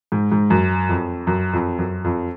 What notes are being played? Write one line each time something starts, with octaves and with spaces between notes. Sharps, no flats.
G#2
G#2
F#2
F2
F#2
F2
F#2
F2